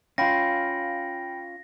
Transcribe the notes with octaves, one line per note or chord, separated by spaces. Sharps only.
C#4 F4 F5 G5 B5 A#6